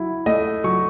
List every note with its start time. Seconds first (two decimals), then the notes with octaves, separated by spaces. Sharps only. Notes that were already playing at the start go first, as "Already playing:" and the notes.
Already playing: F#3 E4
0.26 A3 D#5
0.64 F#3 C#6